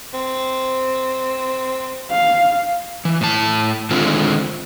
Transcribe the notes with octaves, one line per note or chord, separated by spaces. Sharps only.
C4
F5
E3
A2 A5
D3 D#3 G#3 A3 C4 F4